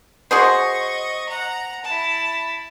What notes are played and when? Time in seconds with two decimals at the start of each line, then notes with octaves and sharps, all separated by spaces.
0.31 F#4 G#4 C5 D#5 C#6
1.29 F#5 A#5
1.84 E4 A5